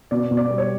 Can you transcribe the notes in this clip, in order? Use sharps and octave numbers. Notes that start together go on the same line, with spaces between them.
B2 D5
B2
D5
G3
C#5